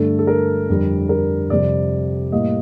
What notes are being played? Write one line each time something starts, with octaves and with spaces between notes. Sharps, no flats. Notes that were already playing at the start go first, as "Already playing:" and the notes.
Already playing: G2 D3 A3 A4
A4
A#4
F2 D3 G3
A#4
F2 C3 G3 D5
A2 G3 A#3 D#5